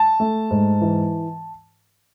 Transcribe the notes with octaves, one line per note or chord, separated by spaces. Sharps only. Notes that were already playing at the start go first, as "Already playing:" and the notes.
Already playing: A5
A3
G#2
E3